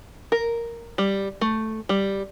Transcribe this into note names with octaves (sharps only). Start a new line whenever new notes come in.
A#4
G3
A3
G3